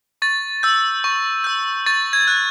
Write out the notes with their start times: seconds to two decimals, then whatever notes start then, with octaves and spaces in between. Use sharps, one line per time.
0.22 C#6 A6
0.63 E6 G6
1.04 C#6
1.44 E6 G6
1.86 C#6 A6
2.13 G#6
2.28 F#6